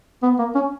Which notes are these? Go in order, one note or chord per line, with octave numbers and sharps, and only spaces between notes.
B3
A#3
C#4